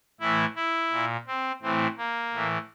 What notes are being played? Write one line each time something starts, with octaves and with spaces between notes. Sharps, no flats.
A2 E3 E4
E4
A#2
C4
A2 E3 C4
A#3
A2 E3